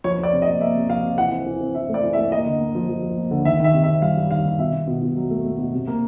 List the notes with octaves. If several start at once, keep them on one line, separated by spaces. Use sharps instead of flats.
F3 C#5
F3 D5
C3
D#5
A#3
A#3 E5
C3
F3 F5
C3
E3 F#5
C4
E3
C4
E3 E5
A3
D5
E3
E5
A3
A#3 D#5
D3
A#3
F3
F3
F3
A#3
D3
D#3 E5
D#3 E5
C3
E5
C4
G3 F5
G3
D#3 F5
D#3
B2 E5
B2
B2
B2
F#3
A3
A3
B2
C3
A#3